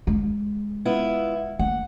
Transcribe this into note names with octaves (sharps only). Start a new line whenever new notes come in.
G#3
B3 E4 F4
A#3 F#5